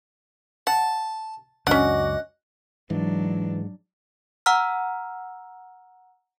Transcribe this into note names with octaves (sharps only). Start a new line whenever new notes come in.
F#5 A5
C#2 F#2 C#4 D4 F#4 D#5 F#5 D6
G#2 E3 F#3 D4
F#5 A#5 E6 F6